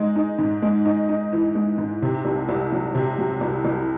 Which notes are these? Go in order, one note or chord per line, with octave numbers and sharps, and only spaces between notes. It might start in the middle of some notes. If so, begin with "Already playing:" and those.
Already playing: G#3 D#4
D#4
G#2
G#3
D#4
D#4
E3
G#3
G#2
C3
C2
C2
F#3
C3
F#3
C2
C2